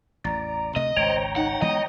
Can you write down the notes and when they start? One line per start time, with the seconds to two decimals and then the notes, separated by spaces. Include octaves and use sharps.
0.25 A1 E2 D5 A#5
0.76 D2 C3 A3 D#5
0.96 G#1 C#2 C5 C#5 G5 A#5
1.36 D#4 F#5
1.62 E3 G#3 B3 D#5 D#6